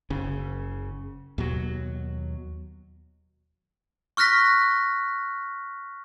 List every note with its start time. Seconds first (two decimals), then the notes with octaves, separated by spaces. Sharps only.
0.10 F#1 C#3
1.38 D#2 B2 F#3
4.17 C#6 F6 F#6 A#6 B6